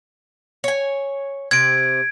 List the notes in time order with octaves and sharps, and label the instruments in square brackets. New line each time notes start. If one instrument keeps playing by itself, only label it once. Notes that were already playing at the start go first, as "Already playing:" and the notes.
[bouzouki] C#5 G#5
[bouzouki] C3 [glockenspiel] G#6 D7